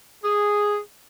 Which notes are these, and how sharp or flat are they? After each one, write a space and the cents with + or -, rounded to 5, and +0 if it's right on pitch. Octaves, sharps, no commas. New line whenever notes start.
G#4 -5